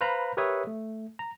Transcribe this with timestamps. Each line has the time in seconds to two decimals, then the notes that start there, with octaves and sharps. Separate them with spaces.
0.01 B4 C5 F5 A#5 B5
0.37 G4 A#4 B4 C#5 E5 D#6
0.67 A3
1.19 A#5